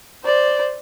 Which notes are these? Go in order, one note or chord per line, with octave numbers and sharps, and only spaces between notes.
C5 D5